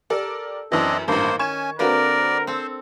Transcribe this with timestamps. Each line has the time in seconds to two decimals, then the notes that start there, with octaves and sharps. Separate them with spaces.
0.10 G4 A4 A#4 D5
0.72 F#2 E3 C4 D4 D#5
1.08 A1 G2 D#3 A#3 C5
1.39 C#4 G#5 C#6 G#6 E7
1.79 D3 A#3 C4 D4 F#4 A#4 B4 D5
2.47 C4 A4 C5